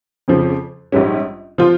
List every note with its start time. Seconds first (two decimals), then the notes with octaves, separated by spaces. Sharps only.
0.28 F2 C#3 F3
0.92 A#1 G#2 G3 C#4
1.58 F3 C4 F4